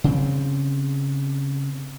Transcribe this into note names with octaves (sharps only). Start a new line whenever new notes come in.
C#3 C4